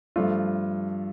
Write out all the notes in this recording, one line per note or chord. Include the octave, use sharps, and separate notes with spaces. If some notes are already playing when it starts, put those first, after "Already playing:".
G2 F3 A3 F4